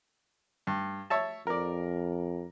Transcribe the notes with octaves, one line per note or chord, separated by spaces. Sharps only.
G2
C#5 E5 A5
F2 A#4 D5